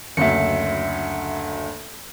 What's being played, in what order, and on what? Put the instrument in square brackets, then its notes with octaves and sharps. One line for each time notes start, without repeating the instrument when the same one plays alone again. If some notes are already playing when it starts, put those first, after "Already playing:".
[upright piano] F#1 D2 [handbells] E5 C#7